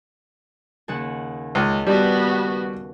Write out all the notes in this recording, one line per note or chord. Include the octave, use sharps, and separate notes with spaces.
D#2 C#3 F#5
C#2 G#4 D#5
G3 B3 F#4 G4 B4 A5